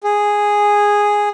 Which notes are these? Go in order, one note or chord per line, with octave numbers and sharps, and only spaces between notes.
G#4